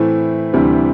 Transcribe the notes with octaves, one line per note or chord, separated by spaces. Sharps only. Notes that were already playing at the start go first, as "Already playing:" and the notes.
Already playing: A2 E3 A3 C4 E4
D2 C3 E3 G3